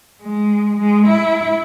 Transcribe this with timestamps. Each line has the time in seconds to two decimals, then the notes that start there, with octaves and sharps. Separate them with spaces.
0.22 G#3
0.79 G#3
1.08 E4